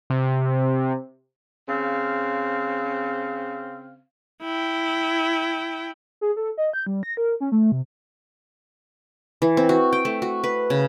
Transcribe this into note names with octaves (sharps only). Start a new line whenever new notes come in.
C3
C#3 C4 F5
E4 G5
G#4
A4
D#5
G6
G3
A#6
A#4
C#4
A3
C3
E3
C4
F#4
G5
A3
F#4
B4
C#3